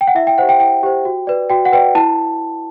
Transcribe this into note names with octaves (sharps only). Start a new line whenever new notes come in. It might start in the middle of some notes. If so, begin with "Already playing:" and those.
G5
F#5
E4 E5
G5
G4 C5 F#5
G5
E4 G5
G4 C5
F#4
B4 D5
F#4 G5
F#5
B4 D5 G5
E4 A5